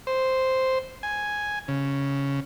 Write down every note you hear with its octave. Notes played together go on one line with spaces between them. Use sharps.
C5
G#5
C#3